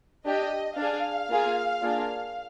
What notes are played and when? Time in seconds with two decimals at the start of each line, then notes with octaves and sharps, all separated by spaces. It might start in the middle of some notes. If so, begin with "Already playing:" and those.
0.25 D4 G4 D#5
0.77 D4 G#4 F5
1.30 A#3 F4 G#4
1.82 A#3 D4 F4 G#4